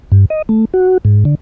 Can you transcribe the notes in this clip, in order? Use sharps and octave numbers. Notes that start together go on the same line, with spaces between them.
G2
D#5
A3
F#4
G#2
D3